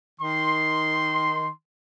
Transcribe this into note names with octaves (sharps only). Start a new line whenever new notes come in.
D#3 C6